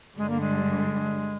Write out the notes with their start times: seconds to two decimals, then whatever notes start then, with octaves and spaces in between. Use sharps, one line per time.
0.17 G2 D3 G3 G#3
0.30 A#3
0.40 G#3